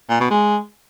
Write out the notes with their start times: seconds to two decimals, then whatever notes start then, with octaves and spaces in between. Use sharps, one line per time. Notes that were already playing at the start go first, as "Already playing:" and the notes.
0.10 A#2
0.20 B2
0.30 G#3